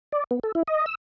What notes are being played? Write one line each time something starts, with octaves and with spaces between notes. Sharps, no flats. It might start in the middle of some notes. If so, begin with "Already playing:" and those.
D5
B3
A4
E4
D#5
E6